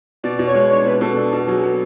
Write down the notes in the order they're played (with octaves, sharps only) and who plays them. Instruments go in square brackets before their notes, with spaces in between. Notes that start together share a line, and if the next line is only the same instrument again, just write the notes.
[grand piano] B2 [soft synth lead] D5
[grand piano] B2
[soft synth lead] C#5
[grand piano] G#3
[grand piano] D4 [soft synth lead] C#5
[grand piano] B2 [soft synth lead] B4
[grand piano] B2 [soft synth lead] A4
[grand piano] D4
B2
[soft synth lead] F#4
[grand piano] F#3 [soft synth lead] G#4
[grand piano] B3 [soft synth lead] A4